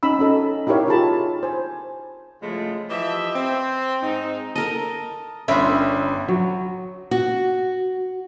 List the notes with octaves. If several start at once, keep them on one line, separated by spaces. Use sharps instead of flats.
C#4 D#4 B5 E6
C#4 F#4 A4 D#5
D#4 E4 G4 A#4 C#5 F5
F4 G4 G#4 A5 B5
C5 G#5
C#3 F3 G#3 A3 E4 F4
E3 F3 G4 D#5 E5
C4
G#2 D#4
A4 A#4 D#5 A5
G1 C#4 D4 A#4 D5 E5 B5 C6
F#3
F#4